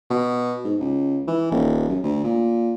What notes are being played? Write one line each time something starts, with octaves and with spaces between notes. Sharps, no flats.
B2
G#2
C#2
E3
D#1
F#2
D2
A#2